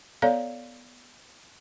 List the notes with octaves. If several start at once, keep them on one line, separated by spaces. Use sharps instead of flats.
B3 A4 C#5 D5 F5 A#5